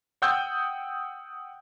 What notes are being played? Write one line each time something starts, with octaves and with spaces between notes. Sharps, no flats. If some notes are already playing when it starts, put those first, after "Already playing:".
F#5 G5 D#6 E6 G6